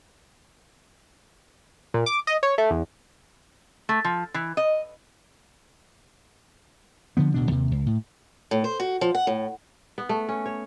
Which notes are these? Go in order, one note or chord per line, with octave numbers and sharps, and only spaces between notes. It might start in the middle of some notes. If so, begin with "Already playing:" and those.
A#2
D6
D#5
C#5
A3
E2
A3
F3
E3
D#5
D3 F3 B3
D1 B2 D4
D#2 C3
C#2
A2
A2
C5
F#4
F3
F#5
A2
B3
A3
C#4
C#5